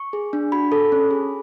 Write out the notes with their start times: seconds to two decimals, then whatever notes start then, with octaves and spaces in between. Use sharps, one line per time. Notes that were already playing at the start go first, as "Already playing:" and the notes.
Already playing: C#6
0.13 G#4
0.33 D4
0.52 F#4 B5
0.72 A4
0.92 C#4
1.11 G#4